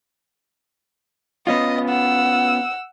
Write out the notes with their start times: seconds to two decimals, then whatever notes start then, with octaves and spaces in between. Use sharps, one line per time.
1.47 B3 C#4 F4 D#5
1.89 F#5 E6